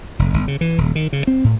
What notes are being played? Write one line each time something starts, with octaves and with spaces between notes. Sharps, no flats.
F1
G1
C#3
E3
D#1
D#3
C#3
C4
A2